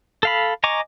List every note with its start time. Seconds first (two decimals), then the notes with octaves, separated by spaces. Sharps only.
0.23 A4 F5 B5
0.64 D#5 G#5 A#5 C#6 D6